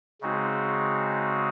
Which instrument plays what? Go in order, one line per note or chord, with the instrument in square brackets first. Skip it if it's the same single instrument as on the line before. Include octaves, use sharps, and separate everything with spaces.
[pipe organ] C#3 G#3 C4 D#4 F#4